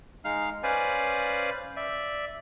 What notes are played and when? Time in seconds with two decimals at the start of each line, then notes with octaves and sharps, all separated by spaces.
0.24 G#3 D#4 F5 F6
0.63 C#4 B4 C5 D5 F5 G#5
1.76 D5 E5